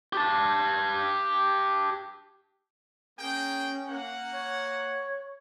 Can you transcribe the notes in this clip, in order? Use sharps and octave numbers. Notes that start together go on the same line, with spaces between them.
G4 A5
A#3 C#4 G#4 G5
A#3 F#5
C#5